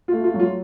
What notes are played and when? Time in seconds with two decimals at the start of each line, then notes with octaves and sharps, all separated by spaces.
0.08 A3 F4
0.24 F4
0.34 F#3
0.40 F4